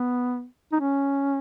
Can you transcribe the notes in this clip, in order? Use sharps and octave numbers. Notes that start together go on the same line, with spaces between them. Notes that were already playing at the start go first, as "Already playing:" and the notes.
Already playing: B3
D#4
C#4